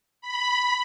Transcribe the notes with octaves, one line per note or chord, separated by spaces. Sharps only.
B5